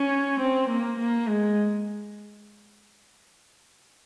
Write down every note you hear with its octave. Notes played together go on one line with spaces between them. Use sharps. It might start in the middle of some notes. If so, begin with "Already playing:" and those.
Already playing: C#4
C4
A#3
A#3
G#3